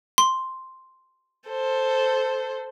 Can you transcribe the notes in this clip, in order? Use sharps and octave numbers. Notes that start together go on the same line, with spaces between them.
C6
A4 C5